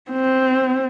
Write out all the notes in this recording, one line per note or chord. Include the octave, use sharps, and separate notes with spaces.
C4